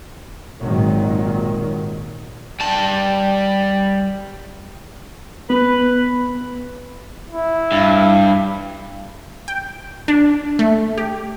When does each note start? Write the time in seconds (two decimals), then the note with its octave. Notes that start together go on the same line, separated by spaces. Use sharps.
0.58 G#1 A#2 D#3 F#3
2.60 G3 A5
5.50 B3 B4
7.30 E4
7.72 G2
9.48 G5
10.08 D4
10.59 A3
10.97 G4